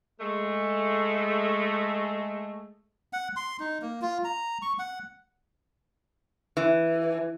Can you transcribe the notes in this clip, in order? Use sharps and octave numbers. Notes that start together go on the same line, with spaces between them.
G#3 A3
F#5
C6
D#4
A#3
F4
A#5
C#6
F#5
E3